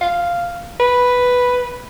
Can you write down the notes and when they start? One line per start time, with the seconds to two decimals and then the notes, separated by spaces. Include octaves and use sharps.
0.01 F5
0.80 B4